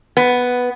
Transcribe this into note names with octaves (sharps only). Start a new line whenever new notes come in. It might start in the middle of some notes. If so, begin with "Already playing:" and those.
B3